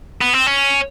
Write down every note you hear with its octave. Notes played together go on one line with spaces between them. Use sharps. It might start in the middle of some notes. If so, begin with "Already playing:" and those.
B3
C4
C#4